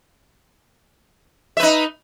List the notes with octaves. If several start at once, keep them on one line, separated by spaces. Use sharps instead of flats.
D#4 B4 E5